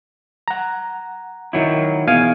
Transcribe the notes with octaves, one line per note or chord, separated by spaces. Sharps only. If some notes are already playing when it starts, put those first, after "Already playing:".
F#5 A#5
D#3 F#3 E4
E2 B2 F5 G#5